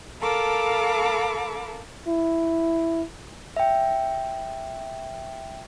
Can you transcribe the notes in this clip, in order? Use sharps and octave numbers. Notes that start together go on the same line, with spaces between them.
A4 A#4 F5 A5 B5 D6
E4
E5 G5